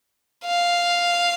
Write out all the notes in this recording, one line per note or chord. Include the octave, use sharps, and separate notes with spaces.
F5